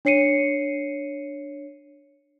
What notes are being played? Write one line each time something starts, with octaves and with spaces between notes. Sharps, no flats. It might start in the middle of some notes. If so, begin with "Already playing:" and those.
D4 C#5 C7 C#7 D#7